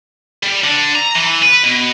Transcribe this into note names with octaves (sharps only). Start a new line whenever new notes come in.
G3
D3
A#5
E3
B4
B2